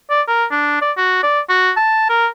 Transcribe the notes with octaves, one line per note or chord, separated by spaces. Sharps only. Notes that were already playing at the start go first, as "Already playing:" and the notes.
D5
A#4
D4
D5
F#4
D5
F#4
A5
A#4